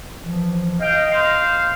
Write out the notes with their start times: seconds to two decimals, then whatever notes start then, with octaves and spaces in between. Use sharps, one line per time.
0.22 E3 F3
0.80 D#5 F5 G5
1.10 C5 F5